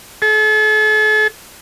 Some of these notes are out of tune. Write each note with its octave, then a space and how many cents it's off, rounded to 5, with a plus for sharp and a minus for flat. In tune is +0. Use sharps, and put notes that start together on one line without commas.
A4 -40